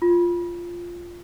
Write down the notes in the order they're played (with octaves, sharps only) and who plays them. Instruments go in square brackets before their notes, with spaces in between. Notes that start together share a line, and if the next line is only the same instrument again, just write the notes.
[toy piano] F4